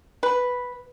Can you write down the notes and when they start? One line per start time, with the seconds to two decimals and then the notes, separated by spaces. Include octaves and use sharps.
0.23 B4